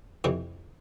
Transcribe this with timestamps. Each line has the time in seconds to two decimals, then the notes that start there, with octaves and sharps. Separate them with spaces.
0.24 F2 C3 E3